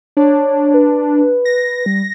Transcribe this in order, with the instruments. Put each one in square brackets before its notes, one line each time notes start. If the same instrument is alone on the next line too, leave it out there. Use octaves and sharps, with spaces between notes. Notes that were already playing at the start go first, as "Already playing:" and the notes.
[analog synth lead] D4 [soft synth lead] C#5
[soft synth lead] B4
[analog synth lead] A#6
[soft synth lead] G3